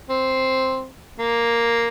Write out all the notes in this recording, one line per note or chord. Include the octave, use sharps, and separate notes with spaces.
C4
A#3